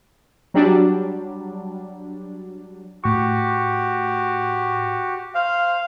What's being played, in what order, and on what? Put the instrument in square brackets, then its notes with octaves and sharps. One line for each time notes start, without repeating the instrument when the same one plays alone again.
[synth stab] F#3 G3 D4
[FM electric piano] A2 C#6 [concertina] F#4 G4
[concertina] C5 [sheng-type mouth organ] F5